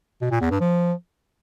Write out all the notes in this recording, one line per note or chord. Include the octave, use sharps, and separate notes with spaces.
B2
A#2
E2
G2
F3